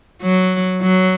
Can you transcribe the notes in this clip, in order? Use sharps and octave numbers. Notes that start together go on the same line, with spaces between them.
F#3
F#3